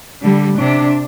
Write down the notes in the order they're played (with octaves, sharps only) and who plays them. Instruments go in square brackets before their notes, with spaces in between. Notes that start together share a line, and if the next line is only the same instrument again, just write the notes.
[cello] D3 [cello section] G3
[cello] C3 [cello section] D4